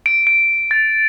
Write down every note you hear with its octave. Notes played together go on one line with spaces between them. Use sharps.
D7
D7
A6